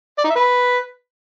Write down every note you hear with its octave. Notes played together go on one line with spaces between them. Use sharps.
D5
D#4
E5
B4